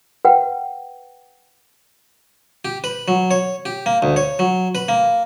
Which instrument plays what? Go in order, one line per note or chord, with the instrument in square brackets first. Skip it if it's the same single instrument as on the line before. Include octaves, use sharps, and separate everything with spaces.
[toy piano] B4 F#5 G5
[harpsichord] G4
B4
F#3
C#5
G4
A#3
D2
C#5
F#3
B4
A#3